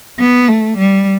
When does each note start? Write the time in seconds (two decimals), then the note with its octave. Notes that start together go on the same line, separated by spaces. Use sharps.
0.20 B3
0.48 A3
0.77 G3